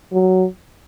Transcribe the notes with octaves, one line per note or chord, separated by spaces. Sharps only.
F#3